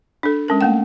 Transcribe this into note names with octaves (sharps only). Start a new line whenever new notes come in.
D4 A4
G#3 C#4 A#4
A3 A#3 G5